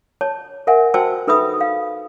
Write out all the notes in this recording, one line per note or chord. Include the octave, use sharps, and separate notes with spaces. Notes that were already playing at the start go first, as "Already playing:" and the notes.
C#5 A5
A#4 E5 F#5 G#5
F#4 C5 G5 A5 E6
D#4 A4 B4 E5 B5 D#6
F5